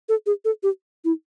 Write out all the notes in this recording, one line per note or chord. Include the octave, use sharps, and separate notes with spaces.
A4
G#4
A4
G4
E4